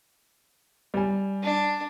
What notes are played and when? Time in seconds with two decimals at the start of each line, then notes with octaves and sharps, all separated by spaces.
0.94 G3 G#5
1.43 D4